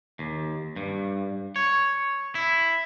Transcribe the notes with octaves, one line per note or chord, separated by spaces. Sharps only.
D#2
G2
C#5
E4